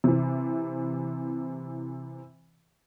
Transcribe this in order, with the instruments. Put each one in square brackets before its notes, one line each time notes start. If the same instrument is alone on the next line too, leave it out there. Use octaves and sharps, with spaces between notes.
[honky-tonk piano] C3 E3